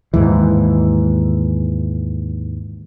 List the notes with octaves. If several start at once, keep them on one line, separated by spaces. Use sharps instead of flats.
D#2 G#2 E3